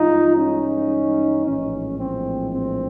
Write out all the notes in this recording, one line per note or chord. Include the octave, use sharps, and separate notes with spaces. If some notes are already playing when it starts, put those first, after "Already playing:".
Already playing: G2 E3 G#3 D#4 F4
C#4 D#4
A#1 A2 E3 G#3 C#4
C4
C4